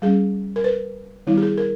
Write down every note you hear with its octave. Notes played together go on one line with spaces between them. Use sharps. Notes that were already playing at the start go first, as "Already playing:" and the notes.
G3 C#4 G#4
A#4
B4
D#3 G3 B3 E4
G4
G#4
A#4